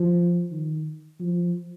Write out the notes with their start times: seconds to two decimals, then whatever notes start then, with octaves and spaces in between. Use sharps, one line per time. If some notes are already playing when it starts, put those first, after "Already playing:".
Already playing: F3
0.51 D#3
1.20 F3